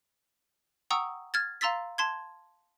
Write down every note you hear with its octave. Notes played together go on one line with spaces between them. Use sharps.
F#5 G5 A#5 C#6 D#6 E6
F6 G#6 A6
F5 A#5 C6 E6 A6 B6
A5 C6 G#6